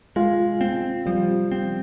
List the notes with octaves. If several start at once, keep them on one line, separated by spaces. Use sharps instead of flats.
G#3 F4
C4
F3 G3
C4